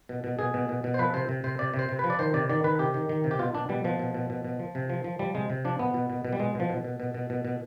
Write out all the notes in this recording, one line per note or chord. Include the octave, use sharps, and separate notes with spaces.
B2
B2
B2 G#4
B2
B2
B2
C5
F3 B4
C3 C5
C3
C3 C5
C3 D5
C3
C5
C3
F3 B4
D5
D#3 C5
C3 D5
D#3 D5
D#3 B4
C3 G4
D#3
D#3
C3
G4
B2 F4
B2 D4
B2 G3
B2 F3
B2
B2
B2
B2
F3
C3
F3
F3
F3 G3
C3 G#3
C3
F3 D4
B2 B3
B2
B2
B2
G3
B2 G#3
B2 F3
B2
B2
B2
B2
B2
B2